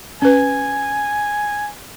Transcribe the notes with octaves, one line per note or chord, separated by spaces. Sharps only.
C#4 B4 G#5